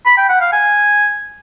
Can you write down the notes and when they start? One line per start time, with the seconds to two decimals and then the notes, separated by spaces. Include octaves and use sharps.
0.06 B5
0.18 G5
0.29 F#5
0.41 F5
0.53 G#5